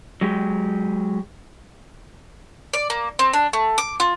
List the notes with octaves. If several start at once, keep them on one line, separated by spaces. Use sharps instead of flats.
F#3 G#3 G4
D5
A#3
C4
D4
A3
D6
F4